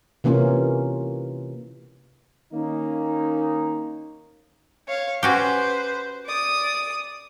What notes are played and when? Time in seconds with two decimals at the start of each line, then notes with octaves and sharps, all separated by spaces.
0.24 C3 E3 A#3 C#4 F4
2.53 D#3 A#3 C#4 D#4
4.87 C#5 F5
5.23 C#4 F#4 G4 B4 C5
6.26 D5 D#6